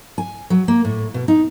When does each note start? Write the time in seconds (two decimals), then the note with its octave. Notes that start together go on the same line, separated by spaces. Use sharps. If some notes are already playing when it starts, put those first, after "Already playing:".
0.18 G#5
0.50 F#3
0.68 A#3
0.85 A2
1.14 B2
1.28 D#4